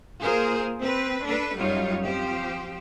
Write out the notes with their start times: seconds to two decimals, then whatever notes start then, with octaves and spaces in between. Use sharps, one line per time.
0.22 A#3 F4 G#4 A#4 C5
0.79 C4 B4
1.24 D4 A4 B4
1.58 F#2 F#3 G3 D#4 F4 C#5
2.01 F3 C4 G4 C5